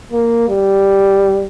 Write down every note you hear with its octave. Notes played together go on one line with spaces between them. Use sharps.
A#3
G3